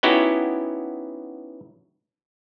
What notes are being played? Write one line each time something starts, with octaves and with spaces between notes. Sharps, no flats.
B3 C#4 D#4 E4 F#4 G4